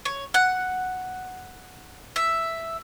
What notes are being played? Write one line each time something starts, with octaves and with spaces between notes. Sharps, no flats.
C#5
F#5
E5